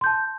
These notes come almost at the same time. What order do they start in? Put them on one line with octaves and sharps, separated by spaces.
C6 G6 A5